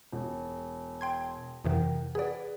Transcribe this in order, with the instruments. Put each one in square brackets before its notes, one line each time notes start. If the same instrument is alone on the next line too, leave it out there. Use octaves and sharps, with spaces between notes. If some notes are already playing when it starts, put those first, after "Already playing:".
[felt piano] E1
[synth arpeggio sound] G5 C6 G#6
[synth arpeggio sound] F2 C3 E3 [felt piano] A#4 F#5 G5
[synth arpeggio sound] G#4 D5 [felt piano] B4 F#5